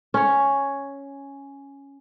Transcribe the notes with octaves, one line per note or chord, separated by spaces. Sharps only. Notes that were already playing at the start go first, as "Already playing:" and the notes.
C#4 C#5